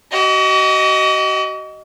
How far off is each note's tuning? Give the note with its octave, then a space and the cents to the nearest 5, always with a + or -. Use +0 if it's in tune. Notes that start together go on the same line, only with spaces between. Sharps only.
F#4 +45 D#5 +0